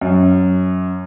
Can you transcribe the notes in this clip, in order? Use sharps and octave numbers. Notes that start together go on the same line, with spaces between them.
F#2